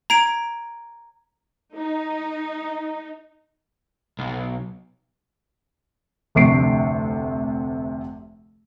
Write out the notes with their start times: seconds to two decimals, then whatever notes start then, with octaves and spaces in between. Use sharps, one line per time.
0.10 A#5 G#6 D7
1.76 D#4
4.19 B1
6.35 F1 D2 C3 C#6 C7 D7